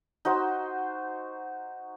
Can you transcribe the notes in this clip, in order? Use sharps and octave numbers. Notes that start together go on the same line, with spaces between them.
D#4 F#4 C5